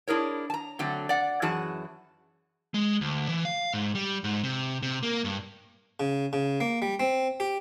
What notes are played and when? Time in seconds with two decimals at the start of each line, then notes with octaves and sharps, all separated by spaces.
0.08 D4 E4 G#4 A#4 C#5
0.50 A5 A#5
0.79 D3 F#3 A3 C4
1.09 D5 F#5
1.42 F#2 E3 F#4 G#4 A5
2.74 G#3
3.01 D2
3.29 E3
3.45 F5
3.74 G#2
3.95 G3
4.24 G#2
4.44 C3
4.83 C3
5.03 A#3
5.24 G2
6.00 C#3
6.33 C#3
6.60 A#3
6.82 G3
7.00 C4
7.40 G4